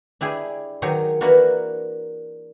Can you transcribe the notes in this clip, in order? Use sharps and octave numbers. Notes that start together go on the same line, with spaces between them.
D4 E4 G4 G#4
D#3 F#3 G4 G#4 C#5
E3 A#3 D4 F#4 A#4 B4